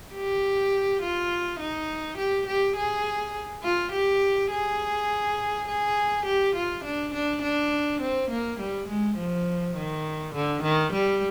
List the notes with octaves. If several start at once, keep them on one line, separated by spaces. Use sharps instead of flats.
G4
F4
D#4
G4
G4
G#4
F4
G4
G#4
G#4
G4
F4
D4
D4
D4
C4
A#3
G3
G#3
F3
D#3
D3
D#3
G3